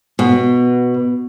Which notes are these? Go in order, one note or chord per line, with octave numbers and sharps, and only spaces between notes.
B2